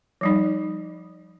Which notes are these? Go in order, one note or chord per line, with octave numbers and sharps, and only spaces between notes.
F3 G3 D#4